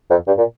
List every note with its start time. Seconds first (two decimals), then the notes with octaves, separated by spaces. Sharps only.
0.11 F2
0.27 G2
0.38 A#2